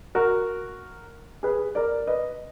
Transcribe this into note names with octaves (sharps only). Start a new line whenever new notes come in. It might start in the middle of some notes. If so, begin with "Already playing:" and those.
F#4 A#4
G#4 B4
A#4 D5
B4 D#5